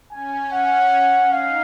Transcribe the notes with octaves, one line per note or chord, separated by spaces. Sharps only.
C#4 G#5
F#5
D#4 F5